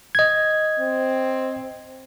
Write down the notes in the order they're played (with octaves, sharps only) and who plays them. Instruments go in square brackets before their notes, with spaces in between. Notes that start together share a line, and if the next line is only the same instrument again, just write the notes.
[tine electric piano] D#5 G#6
[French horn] C4